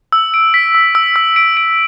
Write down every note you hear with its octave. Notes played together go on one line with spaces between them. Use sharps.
E6
D7
B6
E6
E6
E6
D7
D7